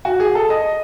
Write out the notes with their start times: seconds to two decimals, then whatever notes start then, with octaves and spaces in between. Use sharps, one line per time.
0.05 F#4
0.20 G#4
0.35 A4
0.50 D#5